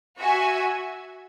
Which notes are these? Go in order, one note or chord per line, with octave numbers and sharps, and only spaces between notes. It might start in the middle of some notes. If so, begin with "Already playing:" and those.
F#4 E5 G#5